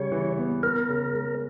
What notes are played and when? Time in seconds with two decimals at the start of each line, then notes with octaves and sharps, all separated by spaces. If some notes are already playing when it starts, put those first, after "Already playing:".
Already playing: C#3 G3 C#5
0.12 E3
0.38 B3
0.63 B3 A#4
0.89 C#3
1.14 G#3